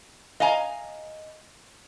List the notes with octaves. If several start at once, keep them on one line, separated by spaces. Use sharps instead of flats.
D#5 F5 G#5 A#5